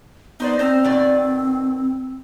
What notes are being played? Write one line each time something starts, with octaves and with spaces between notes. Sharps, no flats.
B3 D#4 C5 D5
C4 C5 A#5
B2 D#3 D5